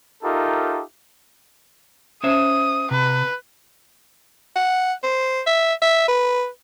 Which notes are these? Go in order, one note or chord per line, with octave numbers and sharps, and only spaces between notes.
D#4 F4 G4 A4 A#4 E5
C#4 C5 E5 D#6
C3 B4
F#5
C5
E5
E5
B4